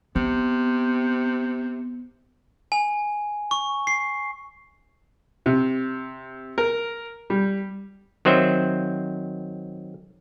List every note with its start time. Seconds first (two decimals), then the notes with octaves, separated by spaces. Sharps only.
0.16 C3 B3
2.72 G#5
3.51 C#6
3.87 C7
5.46 C3
6.58 A#4
7.30 G3
8.25 D#3 F#3 C4 C5 E5